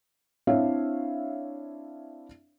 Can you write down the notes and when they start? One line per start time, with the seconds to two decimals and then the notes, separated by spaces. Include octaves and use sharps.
0.47 C4 D4 E4 C#5 E5 F5